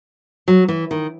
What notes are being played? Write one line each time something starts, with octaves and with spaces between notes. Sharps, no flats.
F#3
E3
D#3